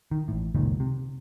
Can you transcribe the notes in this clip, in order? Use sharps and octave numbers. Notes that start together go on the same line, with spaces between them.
D#3
A1 A2
F#1 C#2 A#2 D#3
C3